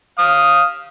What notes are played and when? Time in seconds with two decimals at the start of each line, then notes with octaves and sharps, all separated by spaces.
0.19 F5 D#6